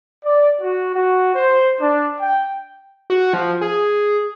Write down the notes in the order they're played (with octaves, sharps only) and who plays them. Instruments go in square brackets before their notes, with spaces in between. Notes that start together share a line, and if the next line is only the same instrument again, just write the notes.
[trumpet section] D5
F#4
F#4
C5
D4
G5
[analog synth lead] F#4
F3
G#4